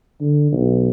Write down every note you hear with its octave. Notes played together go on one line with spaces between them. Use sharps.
D3
B1